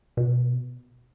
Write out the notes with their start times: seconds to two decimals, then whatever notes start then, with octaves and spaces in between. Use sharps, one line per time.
0.17 B2